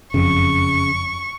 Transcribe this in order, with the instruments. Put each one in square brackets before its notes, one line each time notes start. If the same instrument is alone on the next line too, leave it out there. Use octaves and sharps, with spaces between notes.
[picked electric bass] F#1 F2 [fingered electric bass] C#3 [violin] C#6